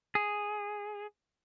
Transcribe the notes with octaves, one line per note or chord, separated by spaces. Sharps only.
G#4